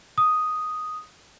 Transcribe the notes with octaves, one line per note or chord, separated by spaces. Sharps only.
D#6